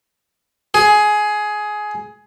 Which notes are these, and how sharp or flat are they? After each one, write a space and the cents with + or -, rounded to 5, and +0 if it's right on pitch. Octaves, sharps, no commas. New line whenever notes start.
G#4 +15